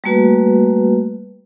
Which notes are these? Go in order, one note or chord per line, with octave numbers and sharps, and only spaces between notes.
G3 A3 A#3 F#4 B4